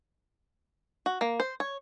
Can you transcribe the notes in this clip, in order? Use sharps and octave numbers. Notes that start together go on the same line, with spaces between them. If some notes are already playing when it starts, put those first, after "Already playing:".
F#4
A#3
C5
C#5